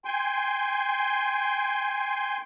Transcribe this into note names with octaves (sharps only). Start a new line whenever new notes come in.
G5 G#5 C6